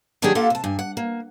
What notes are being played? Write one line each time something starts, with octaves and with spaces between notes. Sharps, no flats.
D#3 F#3 A#3 D4 G4 G#4
A#3 F4 G4 A4 E5 F#5
C3 A5
G2 G#5
F#5
A#3